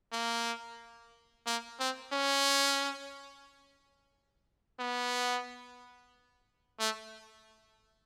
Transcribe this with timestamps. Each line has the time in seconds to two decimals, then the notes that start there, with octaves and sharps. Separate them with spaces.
0.12 A#3
1.47 A#3
1.80 C4
2.13 C#4
4.80 B3
6.80 A3